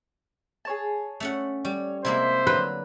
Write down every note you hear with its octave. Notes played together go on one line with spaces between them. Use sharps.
G#4 C#5 A5
A3 C#4 F#5
G3 C#5
C3 G#3 A#3 E4 C5 E5
D3 F#3 B4